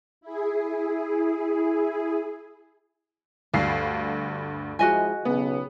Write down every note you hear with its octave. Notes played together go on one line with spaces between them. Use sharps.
E4 G#4
D2 G2 F5 C7
F3 G#3 E4 F#4 D#5 G#5
B1 C#3 B3